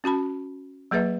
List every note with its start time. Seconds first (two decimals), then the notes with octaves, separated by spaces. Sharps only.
0.04 C#4 F#4 A5 B5
0.91 F#3 A#3 G#4 B4 E5